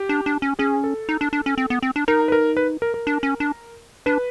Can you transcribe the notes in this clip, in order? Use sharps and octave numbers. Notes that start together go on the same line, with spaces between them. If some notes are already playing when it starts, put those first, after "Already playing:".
Already playing: G4
D4
D4
C#4
C#4 G#4
A4
D#4
D4
D4
C#4
C4
B3
C4
D4
D#4 A#4
B4
A#4
B4
A#4
A#4
D4
C#4
D4
D4 B4